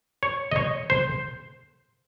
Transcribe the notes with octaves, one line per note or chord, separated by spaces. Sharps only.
C#5
D#5
C#5
C5